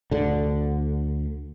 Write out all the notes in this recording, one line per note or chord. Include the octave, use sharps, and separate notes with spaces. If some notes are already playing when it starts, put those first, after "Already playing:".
D2 D3